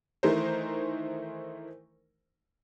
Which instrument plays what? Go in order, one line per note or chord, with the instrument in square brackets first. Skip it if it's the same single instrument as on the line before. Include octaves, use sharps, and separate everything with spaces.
[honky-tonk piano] D#3 E3 A3 D#4 A#4 C5